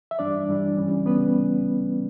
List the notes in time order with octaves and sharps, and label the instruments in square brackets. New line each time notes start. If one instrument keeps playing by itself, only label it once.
[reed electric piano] E5
G2 E3 G3 D4 D5
G2 E3 G3 D4
C#2 C#3 E3 G3 C#4
C#2 C#3 E3 G3 B3 C#4 B4